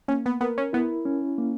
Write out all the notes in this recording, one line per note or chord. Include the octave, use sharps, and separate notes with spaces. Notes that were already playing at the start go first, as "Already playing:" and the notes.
A#3 C#4
B3
B3 A#4
C#4
B3 E4
C#4
A#3